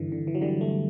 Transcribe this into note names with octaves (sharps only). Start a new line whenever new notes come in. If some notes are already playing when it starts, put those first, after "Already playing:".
Already playing: G2 D3 E3
D3
E3
F#3
D3 G3
A3